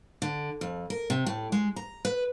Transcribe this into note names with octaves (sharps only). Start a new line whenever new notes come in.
D3
F2
A#4
C3
A2
G#3
A#5
B4